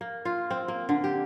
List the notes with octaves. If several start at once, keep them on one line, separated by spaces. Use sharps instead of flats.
A#3
F4
C4
A#3
D3
G4